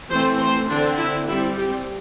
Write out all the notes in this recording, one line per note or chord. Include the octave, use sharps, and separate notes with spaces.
E3 A3 C4 C5
C5
D3 C4 D4
E4
G3 C4 E4
G4